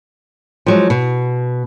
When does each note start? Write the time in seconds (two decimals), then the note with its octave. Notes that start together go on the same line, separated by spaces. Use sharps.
0.66 F3 F#3 G#3
0.90 B2